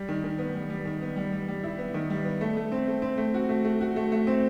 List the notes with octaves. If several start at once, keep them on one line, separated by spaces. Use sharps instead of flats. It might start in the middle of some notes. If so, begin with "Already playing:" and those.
Already playing: G3
D#3
D#3
B3
G3
G3
D#3
B3
G3
G3
G3
E4
B3
D#3
G3
B3
A3
A3
C4
A3
C4
A3
F#4
A3
A3
F#4
A3
A3
C4